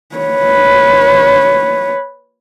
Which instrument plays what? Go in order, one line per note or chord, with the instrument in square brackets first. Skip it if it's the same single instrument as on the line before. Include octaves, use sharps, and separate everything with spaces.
[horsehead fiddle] B4 C#5